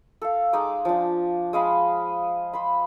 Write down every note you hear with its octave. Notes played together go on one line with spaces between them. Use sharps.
A4 F5
G#3 D#4 F5 D6
F3 D4
G#3 D#5 F5 B5
C5 B5